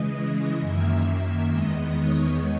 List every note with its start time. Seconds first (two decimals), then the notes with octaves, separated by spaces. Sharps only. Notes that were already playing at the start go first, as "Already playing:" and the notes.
Already playing: C#3 E3 G#3 D#5
0.14 D#5
0.60 F#2 D#3 A#3 E5
1.50 E2 D#3 G#3 B3 D#5
1.96 C#5